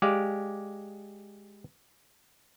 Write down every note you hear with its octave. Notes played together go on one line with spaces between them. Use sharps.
G#3 G4 D5 F5